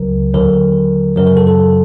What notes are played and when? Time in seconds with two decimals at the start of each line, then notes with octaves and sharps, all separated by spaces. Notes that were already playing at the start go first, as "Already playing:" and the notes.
Already playing: C#2 C#3 F#3 A#4
0.34 D#2 D3 F#3 A#4
1.16 F#2 C#3 F#3 A#4
1.27 A#4
1.37 A4
1.47 A4